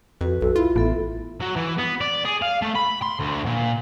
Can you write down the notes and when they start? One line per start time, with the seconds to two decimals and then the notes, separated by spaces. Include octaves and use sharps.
0.21 F2 F#4 B4
0.42 B1 A4
0.56 E4 F4
0.76 A1 B3 A4 E5
1.41 F#3
1.56 E3
1.79 B3
2.01 D5
2.25 G#4
2.42 F5
2.62 A3
2.76 B5
3.02 C6
3.19 D2
3.46 A#2